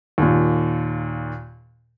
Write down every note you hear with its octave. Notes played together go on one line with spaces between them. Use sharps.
D#2 A#2